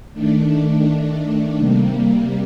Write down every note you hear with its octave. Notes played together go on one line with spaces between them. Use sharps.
D#3 A3 D4
C3 G3 A#3